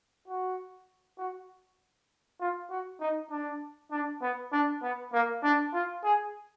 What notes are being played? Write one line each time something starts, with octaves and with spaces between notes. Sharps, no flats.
F#4
F#4
F4
F#4
D#4
D4
D4
B3
D4
B3
A#3
D4
F4
G#4